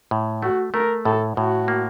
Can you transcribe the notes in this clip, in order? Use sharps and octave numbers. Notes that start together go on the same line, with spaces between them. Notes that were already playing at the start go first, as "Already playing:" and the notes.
A2
A3 F#4
A3 A#4
A2 A4
A2 F#4
A#3